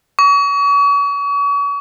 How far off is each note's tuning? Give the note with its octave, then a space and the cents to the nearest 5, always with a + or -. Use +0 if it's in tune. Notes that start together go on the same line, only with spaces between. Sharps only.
C#6 +40